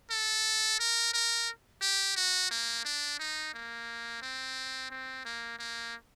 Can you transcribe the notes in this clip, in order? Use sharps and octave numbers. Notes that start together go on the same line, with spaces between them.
A4
A#4
A#4
G4
F#4
A#3
D4
D#4
A#3
C4
C4
A#3
A#3